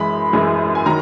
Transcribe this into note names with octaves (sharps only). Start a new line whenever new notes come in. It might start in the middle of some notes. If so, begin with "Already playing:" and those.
Already playing: F#2 E3 G#3 B5
F#2 E3 G#3
G#5
D#3 F#3 A#5